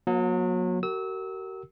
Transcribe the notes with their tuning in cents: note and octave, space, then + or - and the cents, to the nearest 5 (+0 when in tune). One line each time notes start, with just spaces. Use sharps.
F#3 -30 A#3 +40
F#4 +45 A#4 -20 E6 -30